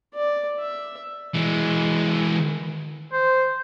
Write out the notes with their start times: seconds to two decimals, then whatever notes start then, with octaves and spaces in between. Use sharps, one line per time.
0.14 D5
0.59 E5
1.34 E3 G#3
3.12 C5